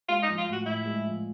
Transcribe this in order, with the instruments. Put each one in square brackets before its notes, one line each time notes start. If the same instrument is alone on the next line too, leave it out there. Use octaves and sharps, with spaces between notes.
[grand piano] G#3 [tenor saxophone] F4
[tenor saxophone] D#4
[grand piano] F3
[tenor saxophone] F4
[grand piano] A2
[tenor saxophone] F#4
[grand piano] A2 [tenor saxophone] E4
[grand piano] G#3
F3